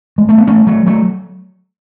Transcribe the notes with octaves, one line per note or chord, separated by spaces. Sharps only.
G#3
A3
B3
A3 C#4
F#3 A3
F#3 A3